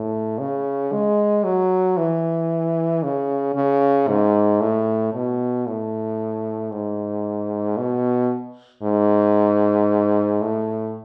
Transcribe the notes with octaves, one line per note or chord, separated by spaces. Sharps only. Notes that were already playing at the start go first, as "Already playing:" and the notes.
Already playing: A2
C#3
G#3
F#3
E3
C#3
C#3
G#2
A2
B2
A2
G#2
B2
G#2
A2